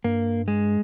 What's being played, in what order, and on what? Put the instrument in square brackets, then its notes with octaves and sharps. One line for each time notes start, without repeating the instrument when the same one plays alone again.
[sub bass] G2 [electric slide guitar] A#3
[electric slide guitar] G#3